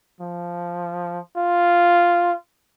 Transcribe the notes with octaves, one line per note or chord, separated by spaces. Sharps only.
F3
F4